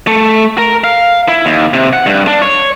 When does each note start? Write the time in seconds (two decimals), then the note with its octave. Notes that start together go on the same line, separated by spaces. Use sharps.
0.07 A3
0.58 A#4
0.84 F5
1.28 E4
1.45 D#2
1.73 C3
1.93 F#5
2.06 G2
2.27 D4
2.42 C#5